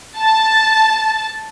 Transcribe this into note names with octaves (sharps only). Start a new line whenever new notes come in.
A5